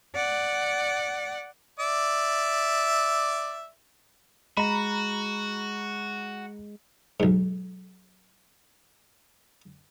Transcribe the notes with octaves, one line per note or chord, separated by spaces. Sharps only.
D5 F#5
D5 E5
G#3 F#4 A#5 B5
B1 G#2